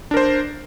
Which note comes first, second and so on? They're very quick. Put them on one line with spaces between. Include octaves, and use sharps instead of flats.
D4 A#4 C5